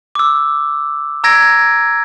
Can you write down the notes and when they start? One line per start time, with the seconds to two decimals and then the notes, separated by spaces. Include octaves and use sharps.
0.15 D6 E6
1.24 A#5 E6 G#6 A#6 D7